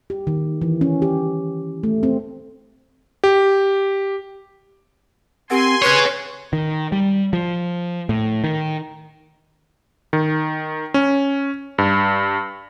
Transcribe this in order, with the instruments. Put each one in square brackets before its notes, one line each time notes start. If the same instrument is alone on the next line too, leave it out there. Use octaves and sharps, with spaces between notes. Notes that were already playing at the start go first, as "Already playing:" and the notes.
[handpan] G4
D#3
E3
C#4
G4
A3
C4
[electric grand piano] G4
[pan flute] C4 [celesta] G4 A#4 F#5 [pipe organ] G#5 C6
[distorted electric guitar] G#4 C#5 [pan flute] B4 [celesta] E7
[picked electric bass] D#3
G3
F3
A2
D#3
[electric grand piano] D#3
C#4
G2